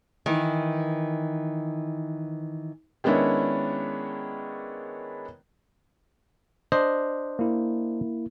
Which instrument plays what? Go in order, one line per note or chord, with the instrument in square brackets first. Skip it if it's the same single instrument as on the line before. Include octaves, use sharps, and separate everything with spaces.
[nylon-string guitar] D#3 E3
[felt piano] D#3 G#3 B3 C#4 D4 E4
[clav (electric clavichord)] D4 C5 D#5
[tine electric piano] A#3 E4